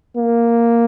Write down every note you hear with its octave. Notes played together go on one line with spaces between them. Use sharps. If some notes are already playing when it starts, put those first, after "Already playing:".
A#3